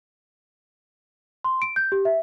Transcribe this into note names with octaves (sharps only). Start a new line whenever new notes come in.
C6
D7
G6
G4
E5